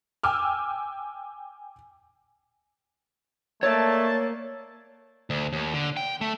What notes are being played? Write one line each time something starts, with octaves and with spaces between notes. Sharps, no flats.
G5 G#5 D6 E6 F6
A3 A#3 C#5 D5 A5
D2
D#2
D3
G5
A3